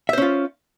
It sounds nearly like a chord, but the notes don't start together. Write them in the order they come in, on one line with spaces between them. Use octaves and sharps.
E5 C5 C#4 F4